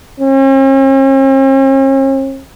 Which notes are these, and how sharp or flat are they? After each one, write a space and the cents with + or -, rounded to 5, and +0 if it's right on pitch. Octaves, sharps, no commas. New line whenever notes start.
C#4 -45